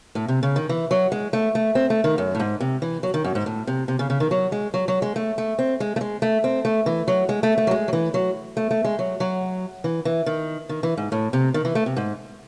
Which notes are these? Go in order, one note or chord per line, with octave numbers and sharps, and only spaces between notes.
A2
C3
C#3
D#3
E3
F#3
G#3
A3
A3
C4
A3
D#3
F#2
A2
G#2
C3
E3
F#3
D#3
F#2
G#2
A2
C3
C3
C#3
C#3
D#3
F#3
G#3
F#3
F#3
G#3
A3
A3
C4
G#3
A3
G#3
A3
C4
A3
E3
F#3
G#3
A3
A3
F#3
G#3
F#3
E3
F#3
A3
A3
G#3
F#3
F#3
E3
E3
D#3
D#3
E3
G#2
A2
C3
D#3
E3
A3
C3
G#2